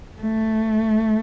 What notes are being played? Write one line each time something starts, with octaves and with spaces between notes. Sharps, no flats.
A3